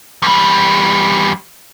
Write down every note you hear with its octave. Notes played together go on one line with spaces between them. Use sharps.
E2 G3